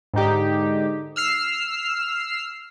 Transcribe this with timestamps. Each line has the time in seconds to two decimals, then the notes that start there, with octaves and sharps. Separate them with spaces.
0.14 G#2 D3 D#4 G4
1.16 E6 F6 C7